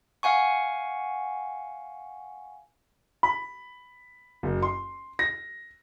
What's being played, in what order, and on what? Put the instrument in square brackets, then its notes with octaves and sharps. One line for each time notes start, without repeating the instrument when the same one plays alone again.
[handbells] F5 F#5 G#5 C#6
[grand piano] B5
F#1
C6
A#6